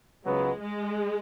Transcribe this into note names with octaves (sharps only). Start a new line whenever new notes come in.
C#2 C#3 F#3 G#3 B3
G#3